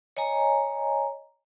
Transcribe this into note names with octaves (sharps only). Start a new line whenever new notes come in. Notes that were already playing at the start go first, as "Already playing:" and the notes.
C#5 D#5 G#5 A#5